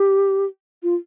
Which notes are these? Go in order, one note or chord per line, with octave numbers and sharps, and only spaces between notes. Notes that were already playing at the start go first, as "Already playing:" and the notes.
Already playing: G4
F4